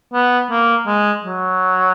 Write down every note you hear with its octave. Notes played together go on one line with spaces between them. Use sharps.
B3
A#3
G#3
F#3